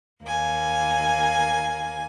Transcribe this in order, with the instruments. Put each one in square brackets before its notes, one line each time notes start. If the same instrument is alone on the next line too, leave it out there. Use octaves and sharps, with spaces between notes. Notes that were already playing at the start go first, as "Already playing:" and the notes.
[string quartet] D#2 A#3 G#5